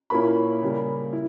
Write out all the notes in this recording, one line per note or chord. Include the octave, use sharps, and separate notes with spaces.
A#2 A#3 C#4 E4 B5
C#3 G3 A#3
E4